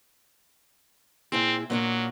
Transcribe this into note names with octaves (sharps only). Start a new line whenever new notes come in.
A#2 C4 E4 G#4
A#2 F#3 A#3 D4